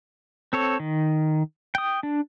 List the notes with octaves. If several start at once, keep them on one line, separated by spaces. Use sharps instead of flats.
C4 A4 C#5
D#3
G5 D#6
D4